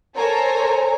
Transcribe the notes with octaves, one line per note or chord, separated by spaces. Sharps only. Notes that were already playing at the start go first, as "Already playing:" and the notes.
A4 A#4 C5 C#5 G#5 A#5